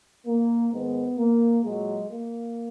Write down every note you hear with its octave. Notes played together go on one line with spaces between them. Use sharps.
A#3
G#2 D#3 G#3 B3
A#3
A#2 F#3 G#3
A#3